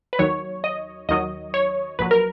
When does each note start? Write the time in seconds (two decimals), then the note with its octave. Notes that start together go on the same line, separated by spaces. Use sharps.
0.13 B4
0.19 D#2 D#3 F#3 C#5
0.64 D#5
1.09 D#2 D#3 F#3 D#5
1.54 C#5
1.99 A#1 A#2 F#3 B4
2.11 A#4